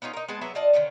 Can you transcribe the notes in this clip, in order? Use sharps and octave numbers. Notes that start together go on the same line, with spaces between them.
B3 C#4 D#4 F4
D#4 A#4
G#3 B3 G#5 A5
F#3 B3 B4 E5
F4 D5 D#5 A5
D3 D#3 F#3 C#4